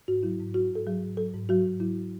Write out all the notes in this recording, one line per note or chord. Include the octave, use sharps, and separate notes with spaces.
G#2 F#4
F#3 E4
G#2
F#3 F#4
G#2 A4
F#3 G#4
G#2
F#3 A4
G#2
F#3 F#4
G#2
F#3 E4